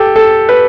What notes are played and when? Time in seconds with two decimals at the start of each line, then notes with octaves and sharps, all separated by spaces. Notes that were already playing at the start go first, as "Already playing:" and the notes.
Already playing: G4 A4
0.16 A4
0.49 B4